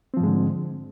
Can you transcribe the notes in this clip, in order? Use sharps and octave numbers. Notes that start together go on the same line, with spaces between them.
G#2 D3 F3 G#3 C4